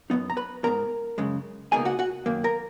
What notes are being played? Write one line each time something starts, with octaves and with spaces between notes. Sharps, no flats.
F#2 F3 B3 D#4
A#5
B4 B5
G#2 F3 B3 A#4 A#5
F#2 C#3 G#3
C#2 B2 A#3 D#4 G#4 G#5
F#4 F#5
F#4 F#5
F#2 D#3 A#3
A#4 A#5